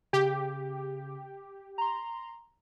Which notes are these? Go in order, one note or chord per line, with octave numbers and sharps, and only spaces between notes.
C#3 G4
A#5 C6